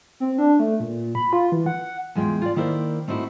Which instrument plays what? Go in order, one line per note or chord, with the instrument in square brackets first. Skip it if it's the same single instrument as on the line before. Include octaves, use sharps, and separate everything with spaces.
[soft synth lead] C4
D4
A3
A#2
B5
F4
E3
F#5
[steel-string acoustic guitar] E2 G#3 F4 F5 G5
F4 D5
D#3 A#3 E4 A#4 C5 D5
A3 C4 D#4 E4 F#4